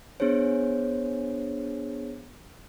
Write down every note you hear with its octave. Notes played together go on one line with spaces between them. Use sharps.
B3 D4 G#4 C5 C#5